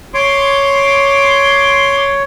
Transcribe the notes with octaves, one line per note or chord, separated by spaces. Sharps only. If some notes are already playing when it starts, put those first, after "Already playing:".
C#5 C6 D6